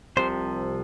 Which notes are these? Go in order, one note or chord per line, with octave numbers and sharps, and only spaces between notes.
C2 C3 F3 C5